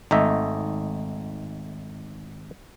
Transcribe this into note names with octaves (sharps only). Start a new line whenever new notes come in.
G#1 A3 D#4 D#5 E5